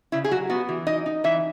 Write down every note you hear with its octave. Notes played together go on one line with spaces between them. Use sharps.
C#3 E4
G#4
F#3 F#4
B3 F#4
E3
D#4 D#5
D#4
E3 E5